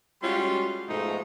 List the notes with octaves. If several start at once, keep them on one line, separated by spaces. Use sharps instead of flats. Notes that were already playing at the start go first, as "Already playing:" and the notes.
G3 G#3 C#4 F4 F#4 C6
G#2 B2 F3 G#3 A3 D#4